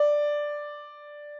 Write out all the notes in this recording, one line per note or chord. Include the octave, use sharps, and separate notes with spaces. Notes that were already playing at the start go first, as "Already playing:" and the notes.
Already playing: D5